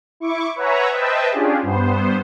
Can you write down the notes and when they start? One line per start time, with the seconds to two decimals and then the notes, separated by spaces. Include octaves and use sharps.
0.20 E4 C#6 D6
0.56 B4 C#5 E5 F#5 G#5 A#5
0.90 B4 C5 D#5 E5 G5 A5
1.31 C#4 D4 F4 G4 G#4
1.63 G2 B3 C5